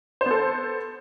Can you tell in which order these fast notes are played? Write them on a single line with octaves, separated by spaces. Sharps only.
C5 B3 A4